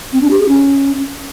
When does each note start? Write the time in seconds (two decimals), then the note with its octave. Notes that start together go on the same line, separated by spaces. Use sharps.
0.13 C4
0.22 D4
0.31 G4
0.40 G#4
0.49 C#4